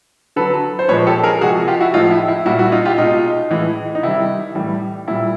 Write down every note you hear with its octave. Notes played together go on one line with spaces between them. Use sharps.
D3 F#3 A4 B4
C5
A#2 F3 G#3 B4 C#5
G4 A4
G#4 A#4
C3 F3 G#3 F#4 G#4
F4 G4
E4 F#4
A2 F3 G#3 D#4 F4
E4
E4
A#2 G3 E4 F#4
E4 F#4
D#4 F4
F4 G4
B2 G#3 D#4 F4
A2 E3 G#3
D#4
C3 D#3 G3 E4
A2 E3 G3
A#2 G3 E4